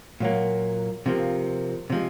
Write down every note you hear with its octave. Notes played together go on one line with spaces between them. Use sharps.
A#2 F#3 A#3
C3 F3 A#3
C3 F3 G#3